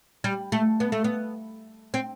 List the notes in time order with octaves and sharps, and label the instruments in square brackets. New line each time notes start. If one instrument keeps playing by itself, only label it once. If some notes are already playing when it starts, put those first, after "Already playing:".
[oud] G3
A3
B3
A3
B3
C4